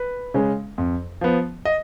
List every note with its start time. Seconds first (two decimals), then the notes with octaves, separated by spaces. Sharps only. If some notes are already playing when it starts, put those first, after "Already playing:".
Already playing: B4
0.34 C#3 G#3 C#4
0.78 F2
1.21 F3 B3
1.65 D#5